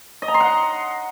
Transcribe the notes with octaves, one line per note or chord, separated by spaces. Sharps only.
D#5
A#5
C6
F#5